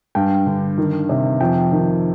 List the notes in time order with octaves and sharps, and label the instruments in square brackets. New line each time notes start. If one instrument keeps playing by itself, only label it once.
[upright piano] G2 G5
D3
D#3
C3
F2 G5
D#3